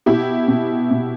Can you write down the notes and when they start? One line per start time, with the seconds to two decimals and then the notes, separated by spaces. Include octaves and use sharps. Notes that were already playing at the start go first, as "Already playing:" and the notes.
0.06 B2 E4 G4
0.48 B2
0.91 B2